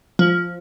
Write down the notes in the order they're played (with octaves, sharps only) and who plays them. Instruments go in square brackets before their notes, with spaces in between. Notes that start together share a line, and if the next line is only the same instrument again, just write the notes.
[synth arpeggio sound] F3